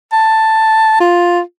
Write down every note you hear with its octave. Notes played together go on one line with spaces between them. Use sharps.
A5
F4